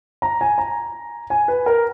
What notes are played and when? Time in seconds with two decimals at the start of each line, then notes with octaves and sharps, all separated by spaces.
0.22 A#5
0.41 G#5
0.58 A#5
1.30 G#5
1.48 B4
1.66 A#4